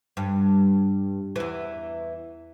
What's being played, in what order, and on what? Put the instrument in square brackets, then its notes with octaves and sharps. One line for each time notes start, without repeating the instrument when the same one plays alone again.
[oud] G2
E2 E3